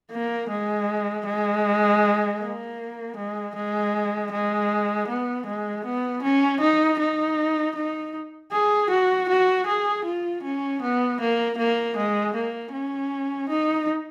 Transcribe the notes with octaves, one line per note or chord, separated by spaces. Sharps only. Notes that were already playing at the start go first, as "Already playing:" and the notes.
A#3
G#3
G#3
A#3
G#3
G#3
G#3
B3
G#3
B3
C#4
D#4
D#4
D#4
G#4
F#4
F#4
G#4
F4
C#4
B3
A#3
A#3
G#3
A#3
C#4
D#4